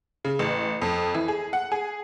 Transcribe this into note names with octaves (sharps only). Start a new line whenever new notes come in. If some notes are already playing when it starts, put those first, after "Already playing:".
C#3
A1
F2
E3
G#4
F#5
G#4